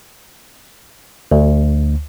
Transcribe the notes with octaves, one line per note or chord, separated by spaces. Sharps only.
D2